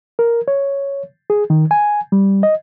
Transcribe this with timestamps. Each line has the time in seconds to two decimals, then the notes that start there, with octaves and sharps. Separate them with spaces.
0.19 A#4
0.48 C#5
1.30 G#4
1.50 D#3
1.71 G#5
2.12 G3
2.43 D#5